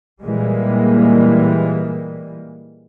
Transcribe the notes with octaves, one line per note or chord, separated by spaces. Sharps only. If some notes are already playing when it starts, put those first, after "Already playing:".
A#2 E3 G3 G#3 A#3